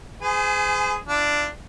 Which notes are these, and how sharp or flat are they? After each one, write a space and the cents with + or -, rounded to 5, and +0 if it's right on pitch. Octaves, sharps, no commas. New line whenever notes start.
G#4 +0 C5 -40 G#5 +20
D4 +0 F4 -45